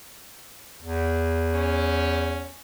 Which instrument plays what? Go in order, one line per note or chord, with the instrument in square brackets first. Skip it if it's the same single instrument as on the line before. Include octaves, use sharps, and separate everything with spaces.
[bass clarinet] E2
[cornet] C#4